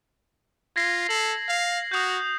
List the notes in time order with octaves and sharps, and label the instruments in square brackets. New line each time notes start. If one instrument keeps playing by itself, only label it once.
[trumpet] F4 [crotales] G#6 A#6 C7
[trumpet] A4 [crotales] F#7
[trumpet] F5
[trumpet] F#4 [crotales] D#6 G6